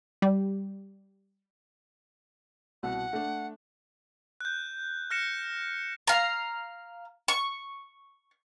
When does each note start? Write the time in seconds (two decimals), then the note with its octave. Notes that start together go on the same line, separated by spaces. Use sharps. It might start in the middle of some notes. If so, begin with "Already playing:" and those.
0.22 G3
2.83 C2 B2 F#5
3.13 A3 D4
4.41 F#6 G6
5.10 F6 F#6 A#6 C#7 E7
6.07 F5 A#5
7.28 C#6